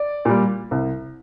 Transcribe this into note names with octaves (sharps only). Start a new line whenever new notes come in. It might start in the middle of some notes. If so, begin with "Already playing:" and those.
Already playing: D5
A#2 G3
C2